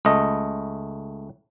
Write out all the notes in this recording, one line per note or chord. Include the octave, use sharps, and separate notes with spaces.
C#2 A3 D#5